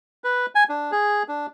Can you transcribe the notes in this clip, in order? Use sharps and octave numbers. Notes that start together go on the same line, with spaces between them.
B4
G#5
D4
G#4
D4